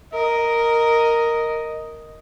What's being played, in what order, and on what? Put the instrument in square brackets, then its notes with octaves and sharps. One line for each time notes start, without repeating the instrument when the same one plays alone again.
[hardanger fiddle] A#4 [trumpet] D#5